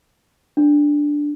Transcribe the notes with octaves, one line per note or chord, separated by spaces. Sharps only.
D4